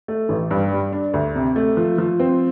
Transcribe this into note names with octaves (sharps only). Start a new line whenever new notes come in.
A3
A1
G2
G3
D4
D2
C3
A3
F3
F3
C4